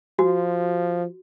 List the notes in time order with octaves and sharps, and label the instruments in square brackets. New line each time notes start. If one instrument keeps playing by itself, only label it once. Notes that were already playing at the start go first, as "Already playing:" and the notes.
[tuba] F3 [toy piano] F#4